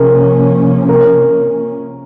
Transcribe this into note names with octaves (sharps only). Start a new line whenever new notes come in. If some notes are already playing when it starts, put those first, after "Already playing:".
Already playing: C3 F3 A#3 C#4 G#4 A#4
A#4